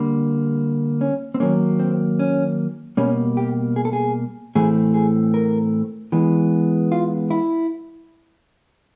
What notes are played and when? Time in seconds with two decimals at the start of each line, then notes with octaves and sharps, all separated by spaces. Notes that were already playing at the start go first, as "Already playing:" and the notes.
Already playing: D3 G3 A#3
1.01 C#4
1.34 C4
1.40 D#3 F#3 A#3 C#4
1.79 C4
2.19 C#4
2.97 B2 G3 A#3 C#4
3.37 G4
3.76 G#4
3.85 A4
3.93 G#4
4.55 A2 E3 A3 C4 G#4
4.94 G#4
5.34 A#4
6.12 E3 G#3 B3
6.92 F4
7.31 E4